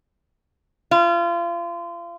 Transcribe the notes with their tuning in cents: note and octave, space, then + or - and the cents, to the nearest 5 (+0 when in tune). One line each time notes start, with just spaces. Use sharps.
F4 -30